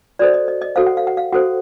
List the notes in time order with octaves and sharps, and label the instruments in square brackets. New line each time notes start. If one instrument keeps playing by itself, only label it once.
[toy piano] F#4 A4 C5 D5
D#5
D#5
D#5
F#4 A4 C5 F5
F#5
F5
F#5
F5
F#4 A4 C5 F#5